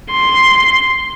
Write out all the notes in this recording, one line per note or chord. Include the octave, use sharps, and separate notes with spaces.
C6